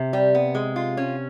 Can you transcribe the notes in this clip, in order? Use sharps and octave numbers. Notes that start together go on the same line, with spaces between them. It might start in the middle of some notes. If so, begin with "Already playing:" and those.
Already playing: C3
G3
B3
G#3
F4
C#4